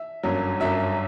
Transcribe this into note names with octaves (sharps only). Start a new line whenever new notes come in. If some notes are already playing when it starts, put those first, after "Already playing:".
Already playing: E5
G1 F#2 F#3
G1 F#2 F#3 E5